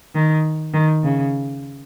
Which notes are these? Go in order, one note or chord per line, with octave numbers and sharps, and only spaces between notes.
D#3
D#3
C#3